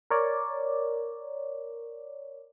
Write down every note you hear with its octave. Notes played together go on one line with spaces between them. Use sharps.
A#4 C#5 D5